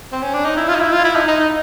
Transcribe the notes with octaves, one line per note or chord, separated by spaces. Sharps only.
C4
C#4
D4
D#4
E4
F4
D#4
E4
F4
E4
D#4
D#4
D#4